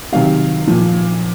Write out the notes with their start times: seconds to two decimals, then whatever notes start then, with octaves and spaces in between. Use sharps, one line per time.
0.12 C3 D#3 F#3 F5
0.67 A#2 F3